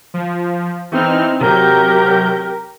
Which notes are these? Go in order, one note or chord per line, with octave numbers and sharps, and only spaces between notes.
F3
E3 C4 D#4 F6
C3 F#3 G4 A#4 G6